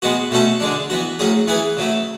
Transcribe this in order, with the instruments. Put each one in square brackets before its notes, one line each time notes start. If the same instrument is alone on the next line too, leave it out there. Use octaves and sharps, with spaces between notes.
[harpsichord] B2 G#3 B3 F#4
B2 A3 C#4 F#4 A4
D3 G#3 D4
E3 B3 F#4
A2 F#3 C#4 G#4
E3 B3 E4 G#4 B4
C#3 F#3 A3 E4